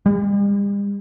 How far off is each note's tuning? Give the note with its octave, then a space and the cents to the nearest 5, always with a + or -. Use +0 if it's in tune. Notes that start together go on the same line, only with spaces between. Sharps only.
G3 +45